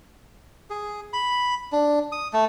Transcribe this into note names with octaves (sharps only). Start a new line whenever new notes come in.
G#4
B5
D4
D#6
A3